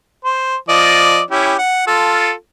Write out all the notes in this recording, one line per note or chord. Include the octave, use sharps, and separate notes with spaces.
C5
F3 D5 D#5
C#4 E4 G4
F#5
F4 A4